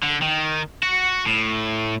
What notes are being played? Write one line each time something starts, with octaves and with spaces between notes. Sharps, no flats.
D3
D#3
F#4
A2